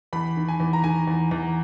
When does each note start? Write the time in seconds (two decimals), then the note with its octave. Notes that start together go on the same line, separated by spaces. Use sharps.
0.13 E2 B5
0.36 D#3
0.48 G#5
0.60 E2
0.73 A#5
0.83 D#3 G#5
1.07 E2
1.31 E2